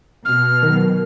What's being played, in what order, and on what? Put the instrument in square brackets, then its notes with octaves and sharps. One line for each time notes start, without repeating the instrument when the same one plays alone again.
[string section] B2 [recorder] F6
[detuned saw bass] D#3 [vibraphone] F#3 A#4